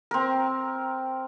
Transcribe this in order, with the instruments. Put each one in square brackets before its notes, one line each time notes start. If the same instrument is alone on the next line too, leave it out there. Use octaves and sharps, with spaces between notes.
[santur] C4 A#4